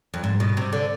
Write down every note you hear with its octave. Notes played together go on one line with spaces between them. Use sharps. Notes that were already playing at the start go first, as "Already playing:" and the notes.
F2
G#2
B2
C3
D3